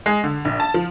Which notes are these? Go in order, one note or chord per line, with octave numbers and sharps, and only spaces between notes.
G#3
D3
A#1
A5
F3